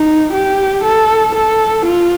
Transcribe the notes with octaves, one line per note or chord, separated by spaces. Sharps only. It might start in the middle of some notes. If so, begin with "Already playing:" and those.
Already playing: D#4
G4
A4
A4
F4